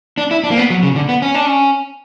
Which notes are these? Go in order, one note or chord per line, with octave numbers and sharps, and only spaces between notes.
D4
E4
D4
A#3
B3
F#3
C#3
D3
B3
C#4
D4
C#4